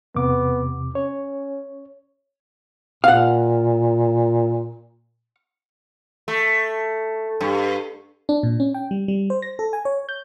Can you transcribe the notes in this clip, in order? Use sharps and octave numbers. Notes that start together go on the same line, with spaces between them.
E2 C3 B3 D6
C#4 C#5
A#2 F5 F#5
A3
G2
D4
A#2
C#4
G5
G3
G3
C5
A#6
A4
G#5
C#5
G6